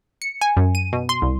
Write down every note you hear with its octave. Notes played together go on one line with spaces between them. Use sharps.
C#7
G#5
F#2
D#7
B2
C6
C2